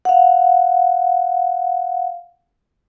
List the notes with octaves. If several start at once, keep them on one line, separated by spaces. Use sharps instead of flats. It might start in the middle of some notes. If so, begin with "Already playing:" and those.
F5 F#5